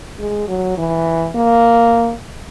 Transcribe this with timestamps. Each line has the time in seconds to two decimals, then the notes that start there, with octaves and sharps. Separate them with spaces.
0.20 G#3
0.48 F#3
0.77 E3
1.35 A#3